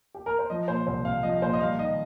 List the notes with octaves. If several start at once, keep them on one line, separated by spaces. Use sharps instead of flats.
G4
A#4
C5
F3 D#5
A#2 C5
C2 C5
C2 F5
F3 D#5
A#2 C5
D#5
G3 F5
D#3 D#5